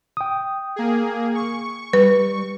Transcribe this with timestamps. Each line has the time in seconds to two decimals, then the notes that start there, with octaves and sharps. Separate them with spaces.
0.17 G5 D#6
0.76 A#3 G#4
1.35 C#6
1.93 G3 B4